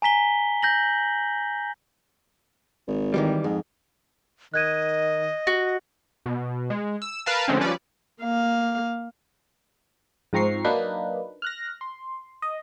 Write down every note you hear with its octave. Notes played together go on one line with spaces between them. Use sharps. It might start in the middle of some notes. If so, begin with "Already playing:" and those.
G#5 A#5 B6 G7
G6 A#6 F#7
G#1
D#3 E3 G3
F2 G#2
D#3 D#5 F#6 G#6 D#7
F#4
B2
G#3
E6
A#4 B4 F5 A5
D3 F3 G#3 A3 C4 C#4
F3 G3 C#4 B4 D5
A#3 F5
G#2 F3 C4 A#5 C#6 C7
F#3 A#3 D4 D#4 B4
F6 F#6 A#6
C6
D#5